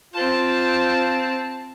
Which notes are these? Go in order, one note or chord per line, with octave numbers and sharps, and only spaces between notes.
C4 F4 A5